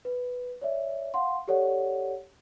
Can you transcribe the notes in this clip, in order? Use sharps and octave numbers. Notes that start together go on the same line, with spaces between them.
B4
C#5 D5 E5
F5 F#5 C6
G4 A4 C#5 D5 F#5